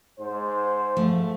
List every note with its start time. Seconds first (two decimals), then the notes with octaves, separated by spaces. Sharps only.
0.19 G#2 C5
0.97 F3 A3